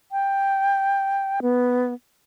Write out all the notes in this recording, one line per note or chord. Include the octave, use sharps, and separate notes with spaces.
G5
B3